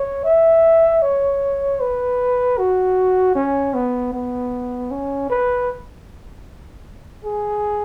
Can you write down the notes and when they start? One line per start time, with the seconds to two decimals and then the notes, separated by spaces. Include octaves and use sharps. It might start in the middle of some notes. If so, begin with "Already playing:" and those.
Already playing: C#5
0.24 E5
1.02 C#5
1.81 B4
2.58 F#4
3.35 C#4
3.74 B3
4.13 B3
4.91 C#4
5.30 B4
7.24 G#4